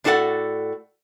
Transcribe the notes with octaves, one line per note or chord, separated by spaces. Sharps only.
A2 D4 F#4 A4 D5 F#5